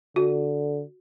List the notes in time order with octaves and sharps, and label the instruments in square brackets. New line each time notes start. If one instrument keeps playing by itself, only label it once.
[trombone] D3 [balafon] F#4